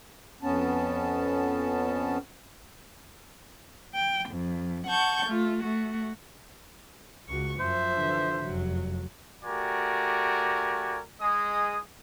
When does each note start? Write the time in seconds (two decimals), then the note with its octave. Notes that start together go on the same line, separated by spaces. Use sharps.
0.42 F2 B3 C#4 A5
3.94 G5
4.30 F2
4.87 F#5 A5 C#6 G6
5.26 A3 F4
5.62 A3 F#4
7.29 C#2 F#4 C#6
7.60 F#2 F3 C5 E5
7.95 D3 E3
8.44 F1 F#2 F#3
9.44 A3 F#4 G4 A#4 D5 G#5
11.20 G#3 G#4 D#5 D#6